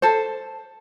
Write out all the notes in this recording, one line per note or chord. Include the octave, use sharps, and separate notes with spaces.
A4 C5